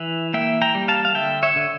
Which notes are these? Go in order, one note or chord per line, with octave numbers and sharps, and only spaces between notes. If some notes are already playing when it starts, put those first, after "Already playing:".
Already playing: E3 E5
A#3 E5 G5
G5 A#5
G3
F5 A5
F5
D3 E5 G5
C#5 E5
D3